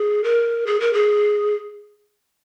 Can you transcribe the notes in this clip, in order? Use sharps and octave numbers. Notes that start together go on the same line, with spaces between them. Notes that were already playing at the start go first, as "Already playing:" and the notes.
Already playing: G#4
A#4
G#4
A#4
G#4